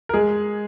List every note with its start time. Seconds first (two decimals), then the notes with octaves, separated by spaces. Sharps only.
0.09 A#4
0.14 G#3 G#4